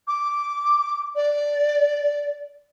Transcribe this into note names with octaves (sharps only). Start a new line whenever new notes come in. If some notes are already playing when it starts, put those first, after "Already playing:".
D6
D5